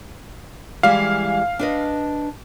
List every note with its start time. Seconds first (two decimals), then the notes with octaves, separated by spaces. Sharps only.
0.83 E3 G3 G#3 F5
1.59 D4 B4 D#5